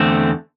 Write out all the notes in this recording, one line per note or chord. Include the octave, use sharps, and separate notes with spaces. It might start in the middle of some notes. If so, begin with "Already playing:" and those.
Already playing: E2 D3 A3 C4